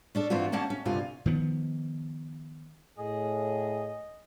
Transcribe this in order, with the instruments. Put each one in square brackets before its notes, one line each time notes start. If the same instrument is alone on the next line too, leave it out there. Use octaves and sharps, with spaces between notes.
[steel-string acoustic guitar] C#4 D4 A4
G2 E3 C4 F4 F#4
A3 A#3 C#4 F#5 A5
C#4
D2 G2 C3 F4 G#5
[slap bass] D#3 F3 B3
[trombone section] A2 [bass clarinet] G#4 [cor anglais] D#5